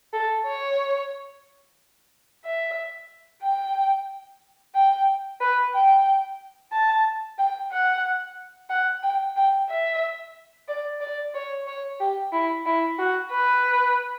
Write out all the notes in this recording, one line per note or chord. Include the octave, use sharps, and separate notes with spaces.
A4
C#5
E5
G5
G5
B4
G5
A5
G5
F#5
F#5
G5
G5
E5
D5
D5
C#5
C#5
G4
E4
E4
F#4
B4